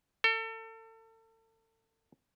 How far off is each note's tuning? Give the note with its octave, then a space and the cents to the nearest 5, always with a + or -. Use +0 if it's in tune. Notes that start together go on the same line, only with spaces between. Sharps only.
A4 +35